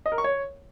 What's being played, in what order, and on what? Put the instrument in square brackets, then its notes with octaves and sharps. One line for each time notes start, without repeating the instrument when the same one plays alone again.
[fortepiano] D#5
A#4
C#6
C#5